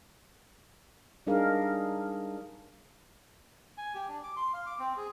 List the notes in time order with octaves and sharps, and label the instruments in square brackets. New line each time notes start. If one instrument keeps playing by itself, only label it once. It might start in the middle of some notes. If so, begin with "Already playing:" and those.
[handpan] G3 D4 D#4 G#4 A#4 F5
[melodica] G#5
G4
D4
D6
C6
F5
D6
C4
G#4